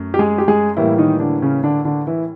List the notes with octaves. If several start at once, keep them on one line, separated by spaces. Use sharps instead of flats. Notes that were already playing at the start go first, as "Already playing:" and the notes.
Already playing: F#2 A3
G4
G#3 G#4
G4
G#3 G#4
A2 E3 G3 A#3 E4
D#3 D#4
D3 D4
C#3 C#4
D3 D4
D3 D4
E3 E4